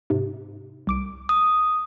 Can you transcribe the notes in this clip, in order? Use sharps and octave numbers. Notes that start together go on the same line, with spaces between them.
G#2 C3
C2 D6 D7
D#6